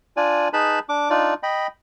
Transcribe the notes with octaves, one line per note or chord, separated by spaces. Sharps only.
D4 F4 D5 G#5
D#4 G#4 B4 A5 B5
D4 D6
D4 D#4 F4 D5
D#5 G5 B5